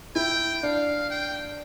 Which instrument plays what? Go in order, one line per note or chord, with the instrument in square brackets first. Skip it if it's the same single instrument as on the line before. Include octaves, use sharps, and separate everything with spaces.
[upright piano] E4 [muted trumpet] G5
[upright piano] D4 [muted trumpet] F5
[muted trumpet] G5